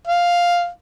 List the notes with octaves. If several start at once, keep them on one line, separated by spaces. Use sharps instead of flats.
F5